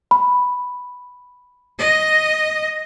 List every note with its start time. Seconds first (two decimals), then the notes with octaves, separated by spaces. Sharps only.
0.11 B5
1.79 D#5